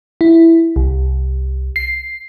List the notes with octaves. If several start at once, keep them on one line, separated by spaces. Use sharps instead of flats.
E4
C2
C7